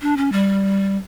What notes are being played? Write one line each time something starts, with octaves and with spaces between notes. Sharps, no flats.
D4
C#4
G3